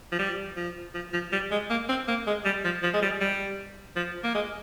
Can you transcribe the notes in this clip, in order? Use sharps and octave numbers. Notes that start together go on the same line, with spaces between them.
F3
G3
F3
F3
F3
G3
G#3
A#3
C4
A#3
G#3
G3
F3
F3
G#3
G3
G3
F3
A#3
G#3